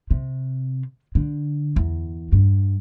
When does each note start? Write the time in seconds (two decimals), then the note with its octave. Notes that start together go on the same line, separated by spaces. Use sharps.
0.11 C3
1.15 D3
1.76 E2
2.32 G2